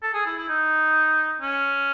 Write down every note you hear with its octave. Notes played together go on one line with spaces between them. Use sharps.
A4
G#4
E4
E4
D#4
C#4